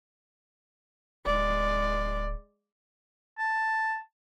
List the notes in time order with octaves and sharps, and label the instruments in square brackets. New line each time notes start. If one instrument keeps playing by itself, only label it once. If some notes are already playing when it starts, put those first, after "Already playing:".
[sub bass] D1 [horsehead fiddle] G#3 D5
[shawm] A5